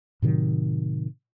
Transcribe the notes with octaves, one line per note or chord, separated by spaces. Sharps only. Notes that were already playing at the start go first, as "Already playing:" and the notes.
A2 C3 D#3 F#3